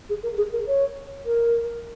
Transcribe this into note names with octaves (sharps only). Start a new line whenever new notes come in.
G#4
A#4
G#4
A#4
C#5
A#4